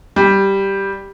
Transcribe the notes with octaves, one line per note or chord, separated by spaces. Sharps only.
G3